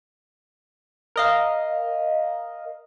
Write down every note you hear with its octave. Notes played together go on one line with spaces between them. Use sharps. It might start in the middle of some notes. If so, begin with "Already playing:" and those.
A#4 D#5 F5